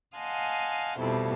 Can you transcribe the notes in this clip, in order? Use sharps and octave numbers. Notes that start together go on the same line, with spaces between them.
D#5 F5 F#5 G#5 A5 C6
F2 B2 G3 E4 A4